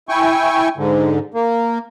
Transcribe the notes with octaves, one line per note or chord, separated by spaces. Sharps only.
E4 G5 G#5 C#6
G#2 D3
A#3